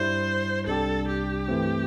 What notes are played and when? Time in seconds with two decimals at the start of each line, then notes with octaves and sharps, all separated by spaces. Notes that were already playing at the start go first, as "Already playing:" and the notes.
Already playing: G2 G3 E4 C5
0.67 C2 C3 G3 D4 G4 A4
1.08 G4
1.48 G2 E3 A3 C4